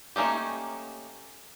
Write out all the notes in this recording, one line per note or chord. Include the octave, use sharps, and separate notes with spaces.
A3 A#3 C#4 D#4 G4